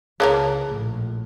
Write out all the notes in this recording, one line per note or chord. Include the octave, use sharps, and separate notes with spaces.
C#2 E3 A#3 G#4 A#4 C#5 A5
A#1 A2